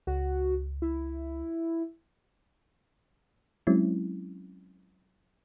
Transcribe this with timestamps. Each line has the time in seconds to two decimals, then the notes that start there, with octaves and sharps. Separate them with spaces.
0.07 C#2 F#4
0.82 E4
3.67 F#3 G#3 C4 C#4 E4